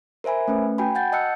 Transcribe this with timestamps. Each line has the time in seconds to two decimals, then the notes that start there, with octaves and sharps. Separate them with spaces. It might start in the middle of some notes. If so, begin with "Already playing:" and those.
0.24 A#4 C5 E5 G#5 B5
0.48 A3 C#4 B4
0.78 F#4 G5 G#5 B5
0.95 F#5 G6 A6
1.12 D#5 F#5 A5 E6 F#6 C#7